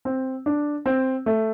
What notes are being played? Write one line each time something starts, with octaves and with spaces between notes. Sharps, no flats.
C4
D4
C4
A3